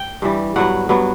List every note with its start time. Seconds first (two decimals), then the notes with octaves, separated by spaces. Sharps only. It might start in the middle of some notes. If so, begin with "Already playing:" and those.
Already playing: G5
0.22 G2 E3 G3
0.56 G2 F#3 B3 F#5
0.89 G2 F#3 B3